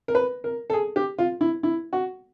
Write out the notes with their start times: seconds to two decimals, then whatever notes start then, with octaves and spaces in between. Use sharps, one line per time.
0.08 A#4
0.15 B4
0.44 A#4
0.70 A4
0.73 G#4
0.96 G4
1.18 F4
1.41 E4
1.63 E4
1.93 F#4